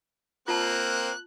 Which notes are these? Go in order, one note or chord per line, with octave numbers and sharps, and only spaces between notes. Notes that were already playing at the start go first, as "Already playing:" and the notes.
A#3 C4 F4 A5 F#6